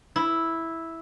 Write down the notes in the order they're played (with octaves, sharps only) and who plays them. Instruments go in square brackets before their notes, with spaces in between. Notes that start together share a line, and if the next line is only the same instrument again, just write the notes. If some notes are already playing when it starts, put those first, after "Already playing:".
[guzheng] E4